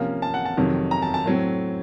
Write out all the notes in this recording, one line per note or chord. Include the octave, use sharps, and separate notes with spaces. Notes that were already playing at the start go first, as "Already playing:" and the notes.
Already playing: C3 F3 A#3 C#4
A5
F#5
A5
F2 C3 D#3 F#3
A#5
A5
A5
A2 F#3 C4